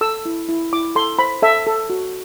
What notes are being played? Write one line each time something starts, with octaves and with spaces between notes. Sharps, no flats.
A4 E6
E4
E4
E4 D6
A4 C6
C5 B5
A4 E5
A4
F#4